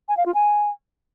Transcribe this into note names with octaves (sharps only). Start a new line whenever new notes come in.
G#5
F5
F4
G#5